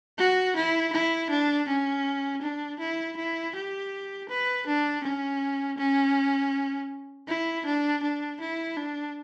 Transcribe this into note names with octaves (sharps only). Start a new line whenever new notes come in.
F#4
E4
E4
D4
C#4
D4
E4
E4
G4
B4
D4
C#4
C#4
E4
D4
D4
E4
D4